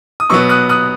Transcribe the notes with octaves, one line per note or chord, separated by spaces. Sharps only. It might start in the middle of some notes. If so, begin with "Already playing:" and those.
D#6
B2 F#3 B3 C#6 E6
D#6 F#6
D#6 F#6